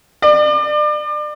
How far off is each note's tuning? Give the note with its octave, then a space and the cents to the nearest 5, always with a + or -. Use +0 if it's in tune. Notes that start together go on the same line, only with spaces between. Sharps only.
D5 +35